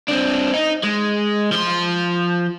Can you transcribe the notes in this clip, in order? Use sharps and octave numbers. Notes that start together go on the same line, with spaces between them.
C4 D4
D#4
G#3
F3 C6